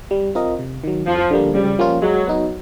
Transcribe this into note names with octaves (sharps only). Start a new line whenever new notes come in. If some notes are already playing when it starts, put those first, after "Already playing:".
G3
C4 F4 A#4 D#5
C3
D#3 F#3
F2 F3
D3 G3 A#3
C#3 G3
F3 A#3 C#4 F4
F#3 G#3
B3 D#4